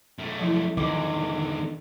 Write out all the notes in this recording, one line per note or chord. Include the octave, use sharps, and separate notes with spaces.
F#2 A3
F3 F#3 E4
E2 D3 D#3 D#4 D6